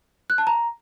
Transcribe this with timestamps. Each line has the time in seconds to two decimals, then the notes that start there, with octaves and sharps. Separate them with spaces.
0.30 F#6
0.38 A5
0.47 A#5